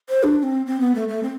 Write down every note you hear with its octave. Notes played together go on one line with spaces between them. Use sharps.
C5
D4
D4
C4
C4
B3
A3
A3
C4